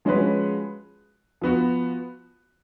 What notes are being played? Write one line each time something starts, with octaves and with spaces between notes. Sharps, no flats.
F3 G#3 C#4 F#4 B4
F3 B3 F#4